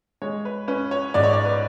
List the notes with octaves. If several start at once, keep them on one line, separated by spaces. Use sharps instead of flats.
G#3 C#5
B4
C#4 B4
C#5
G#2 D5
C#5
D5
B4